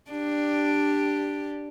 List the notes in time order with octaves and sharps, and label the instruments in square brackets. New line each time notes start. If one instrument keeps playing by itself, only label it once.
[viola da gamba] D4 G4